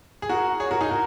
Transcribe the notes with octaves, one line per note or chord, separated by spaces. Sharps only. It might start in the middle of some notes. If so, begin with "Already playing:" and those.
G#4
F#4 A#4
G#4 C#5
F#4 A#4
D#4 G#4
F#4 A#4